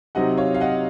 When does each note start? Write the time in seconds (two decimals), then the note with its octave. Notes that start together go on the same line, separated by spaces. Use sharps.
0.15 C3 F#3 C4 D#4 D#5 F#5
0.37 C#5 F5
0.54 F5
0.61 D#5 F#5